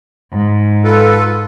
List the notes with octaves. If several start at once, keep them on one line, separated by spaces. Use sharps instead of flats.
G#2
F4 A4 B4